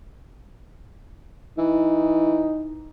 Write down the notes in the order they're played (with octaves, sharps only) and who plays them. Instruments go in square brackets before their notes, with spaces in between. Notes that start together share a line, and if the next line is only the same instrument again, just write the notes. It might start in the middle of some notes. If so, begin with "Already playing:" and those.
[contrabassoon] E3 [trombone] D#4